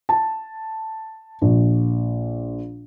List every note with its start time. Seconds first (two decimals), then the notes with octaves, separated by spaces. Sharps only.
0.09 A5
1.41 A#1